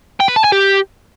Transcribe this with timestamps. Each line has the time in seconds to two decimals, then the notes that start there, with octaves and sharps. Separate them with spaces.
0.20 G5
0.28 B4
0.36 A5
0.44 G#5
0.52 G4